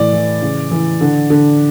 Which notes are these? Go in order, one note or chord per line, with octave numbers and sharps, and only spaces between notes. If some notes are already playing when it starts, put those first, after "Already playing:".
Already playing: A2 E3 D5
E3
C#3
E3
D3
D3